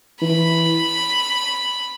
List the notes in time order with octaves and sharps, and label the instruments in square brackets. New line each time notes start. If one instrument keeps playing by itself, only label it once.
[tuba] E3 [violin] B5